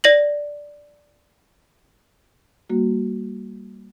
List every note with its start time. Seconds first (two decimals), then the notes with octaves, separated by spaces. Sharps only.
0.04 D5 A#6 F#7
2.70 G3 A#3 F#4